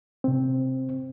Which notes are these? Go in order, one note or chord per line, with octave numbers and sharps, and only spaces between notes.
C3 C4